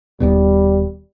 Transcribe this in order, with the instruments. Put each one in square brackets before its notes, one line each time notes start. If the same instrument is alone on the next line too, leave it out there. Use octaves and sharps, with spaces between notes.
[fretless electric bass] D#1 D#2 B2 [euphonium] G3